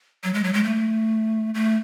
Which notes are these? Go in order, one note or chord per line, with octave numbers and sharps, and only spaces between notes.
F#3
G#3
F#3
G#3
A3
A3